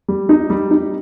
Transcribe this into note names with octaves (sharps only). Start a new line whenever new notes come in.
G3
D#4
G3
D#4